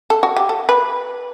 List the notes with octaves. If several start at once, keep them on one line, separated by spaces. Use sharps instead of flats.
A4
F#4
G4
A4
B4